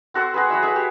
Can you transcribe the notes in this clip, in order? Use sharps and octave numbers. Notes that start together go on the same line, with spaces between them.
C4 F#4 A4 C5
F#4 G#4 B4
F#3 E4 E5
G#4 A4 E5
G4